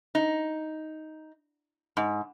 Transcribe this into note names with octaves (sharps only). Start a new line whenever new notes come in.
D#4
G#2